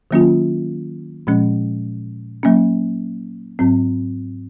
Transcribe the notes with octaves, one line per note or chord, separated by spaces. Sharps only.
D#3 F#3 A#3 C#4 F4
A#2 F3 G#3 C#4
F#3 A#3 C#4
G#2 F#3 C4